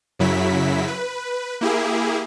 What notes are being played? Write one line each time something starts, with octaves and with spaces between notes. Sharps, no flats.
F#2 C#3 F#3 E4 B6
B4
A#3 E4 G4 G#4